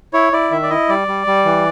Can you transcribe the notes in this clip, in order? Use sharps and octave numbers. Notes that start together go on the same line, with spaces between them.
E4 C#5
E4 D5
D#3 E5
D5
E4 D#5
G3 D5
G3
G3
E3